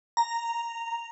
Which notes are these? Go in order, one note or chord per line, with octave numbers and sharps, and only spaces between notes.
A#5